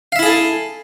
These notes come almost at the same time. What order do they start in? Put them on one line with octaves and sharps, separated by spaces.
F5 E5 E4 G#4 A4